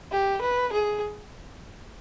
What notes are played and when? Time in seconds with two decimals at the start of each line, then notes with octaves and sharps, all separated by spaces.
0.12 G4
0.42 B4
0.73 G#4